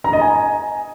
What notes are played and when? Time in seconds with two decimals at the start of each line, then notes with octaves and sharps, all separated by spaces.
0.04 A#5
0.13 D#5
0.21 G#5